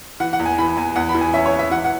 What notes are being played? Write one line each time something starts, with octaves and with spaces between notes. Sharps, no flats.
E3 F#5
F#5
E2
G#5
E3 B5
E2 G#5
E2 F#5
B5
E3
G#5
C#4 E5
C#5
C#4
E5
E3 F#5
F#5